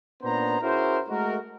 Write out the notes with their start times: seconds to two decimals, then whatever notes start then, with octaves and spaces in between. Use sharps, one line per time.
0.23 A#2 B3 C#4 D4 C5 A#5
0.62 C#4 E4 F#4 G#4 A#4 C5
1.09 G#3 A3 F#4 A#4